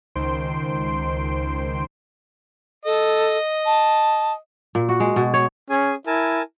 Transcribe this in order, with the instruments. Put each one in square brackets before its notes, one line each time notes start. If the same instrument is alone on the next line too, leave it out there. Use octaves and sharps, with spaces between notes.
[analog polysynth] C#2 D#3 C5 C6 D7
[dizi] A4 [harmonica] D#5
[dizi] A5
[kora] A#2
F#4
G#3
B2
C#5
[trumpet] C#4 [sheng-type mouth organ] G#4 G#5
[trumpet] E4 [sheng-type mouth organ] A#4 G#5 A5